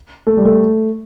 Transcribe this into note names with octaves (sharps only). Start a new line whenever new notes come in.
A3
G3
A3